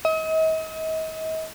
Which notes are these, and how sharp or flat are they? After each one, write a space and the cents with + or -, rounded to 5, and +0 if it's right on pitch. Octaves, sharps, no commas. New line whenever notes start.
D#5 +40